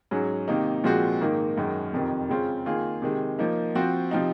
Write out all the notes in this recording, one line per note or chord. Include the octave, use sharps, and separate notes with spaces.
G#2 F#3 C#4 G#4
C3 D#3 A#3 D#4
A#2 F3 G#3 C4 F#4
G#2 D#3 A#3
F#2 D#3 G#3
F2 C3 D#3
C#3 G#3 C4 F4
D#3 A#3 F4 G#4
C3 D#3 G#3
F3 A#3 D#4
F3 C4 F#4
C3 F3 C4 D#4